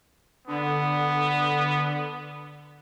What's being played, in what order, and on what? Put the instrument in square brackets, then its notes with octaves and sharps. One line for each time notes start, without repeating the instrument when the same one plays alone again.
[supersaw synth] D3 [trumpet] B3